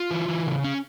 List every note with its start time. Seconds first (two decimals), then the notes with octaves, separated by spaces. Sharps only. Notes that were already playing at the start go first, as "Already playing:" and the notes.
Already playing: F4
0.11 E3
0.28 E3
0.47 C#3
0.64 C#4